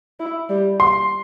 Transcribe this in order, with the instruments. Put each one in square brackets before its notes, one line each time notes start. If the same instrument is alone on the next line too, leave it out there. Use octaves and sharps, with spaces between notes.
[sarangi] E4
G3
[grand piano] C6